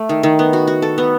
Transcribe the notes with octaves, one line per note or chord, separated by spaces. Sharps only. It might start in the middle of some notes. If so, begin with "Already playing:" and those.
Already playing: A3
D#3
D#3
B3
F#4
F#4
A4
B3